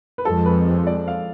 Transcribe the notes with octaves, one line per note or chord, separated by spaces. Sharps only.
B4
F2 F3 G#3 A4
B4
D5
F5